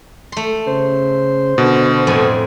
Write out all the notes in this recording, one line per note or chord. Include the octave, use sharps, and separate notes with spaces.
A3 C6
C#3 C5
B2 D3
F2 A2 C5 G#5